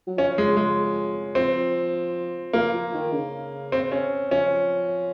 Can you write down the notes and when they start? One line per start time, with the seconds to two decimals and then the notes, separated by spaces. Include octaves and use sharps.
0.07 F#3
0.18 F3 C#4
0.38 G#3
0.57 G#3
1.35 F3 C4
2.53 F3 A#3
2.74 F3
2.94 D#3
3.13 C#3
3.72 C4
3.92 C#4
4.31 F3 C#4